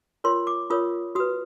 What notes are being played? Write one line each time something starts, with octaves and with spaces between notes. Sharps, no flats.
F4 A#4 C#5 C6
D6
F4 A#4 C#5 D#6
F#4 B4 D#6